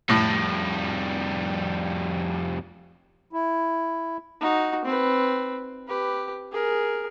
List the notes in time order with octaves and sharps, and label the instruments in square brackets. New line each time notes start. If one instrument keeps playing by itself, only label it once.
[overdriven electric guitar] F2 G3 [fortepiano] A2
[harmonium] E4
[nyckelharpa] D#4 F#4
C4 B4
G4 B4
G#4 A#4